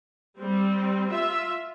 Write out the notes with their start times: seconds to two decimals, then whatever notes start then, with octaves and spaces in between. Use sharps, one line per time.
0.38 G3 C4
1.10 F4 E5